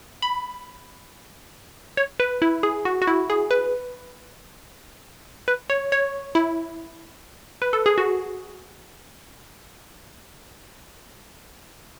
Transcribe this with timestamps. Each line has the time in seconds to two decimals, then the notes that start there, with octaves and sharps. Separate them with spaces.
0.22 B5
1.97 C#5
2.20 B4
2.42 E4
2.63 G#4
2.85 F#4
3.02 F#4
3.07 E4
3.30 G#4
3.51 B4
5.48 B4
5.70 C#5
5.92 C#5
6.35 E4
7.62 B4
7.73 A4
7.86 G#4
7.98 F#4